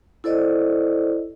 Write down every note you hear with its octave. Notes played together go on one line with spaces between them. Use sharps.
E4 A4 C5 D5 D#5